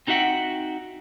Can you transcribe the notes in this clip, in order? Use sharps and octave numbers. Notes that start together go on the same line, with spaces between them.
C4 D#4 F#4 E5 F#5 G5